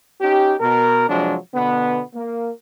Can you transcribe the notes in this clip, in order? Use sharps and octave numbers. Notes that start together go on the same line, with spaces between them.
C#4 D#4 G4
B2 A#4
C3 F3 F#3 G#3 D4
B2 D3 B3
A#3